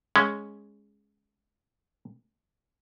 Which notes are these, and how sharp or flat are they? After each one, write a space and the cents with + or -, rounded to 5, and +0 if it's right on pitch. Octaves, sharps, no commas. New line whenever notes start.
G#3 +0 C#4 +0